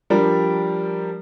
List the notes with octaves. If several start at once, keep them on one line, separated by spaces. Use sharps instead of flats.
F3 G3 D4 A#4